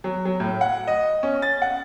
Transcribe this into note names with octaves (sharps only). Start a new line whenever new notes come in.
F#3
F#3
A2
F#5
D#5
C#4
A6
F#5